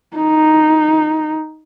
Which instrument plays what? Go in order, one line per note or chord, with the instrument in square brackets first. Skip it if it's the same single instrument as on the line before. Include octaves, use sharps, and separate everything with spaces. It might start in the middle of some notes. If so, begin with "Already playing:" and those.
[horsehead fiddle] D#4